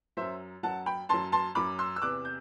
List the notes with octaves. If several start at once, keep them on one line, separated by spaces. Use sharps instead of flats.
F#2 F#3 C5 E5
F#2 F#3 F#5 A5
G5 B5
F#2 F#3 A5 C6
A5 C6
F#2 F#3 B5 D6
C6 E6
E6
E2 C3 E3 D6 F#6
G6